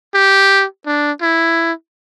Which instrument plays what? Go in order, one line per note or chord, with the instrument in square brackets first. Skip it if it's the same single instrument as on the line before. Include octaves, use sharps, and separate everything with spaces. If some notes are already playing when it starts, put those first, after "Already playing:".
[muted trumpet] G4
D4
E4